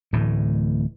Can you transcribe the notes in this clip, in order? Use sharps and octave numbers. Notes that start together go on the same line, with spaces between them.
D1 A2 E3